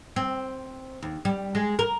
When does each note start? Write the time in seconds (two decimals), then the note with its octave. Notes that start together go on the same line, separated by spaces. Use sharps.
0.16 C4
1.02 D#2
1.25 G3
1.55 G#3
1.79 A#4